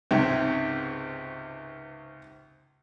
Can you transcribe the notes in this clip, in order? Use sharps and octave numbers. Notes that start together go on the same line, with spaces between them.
C#2 G#2 C3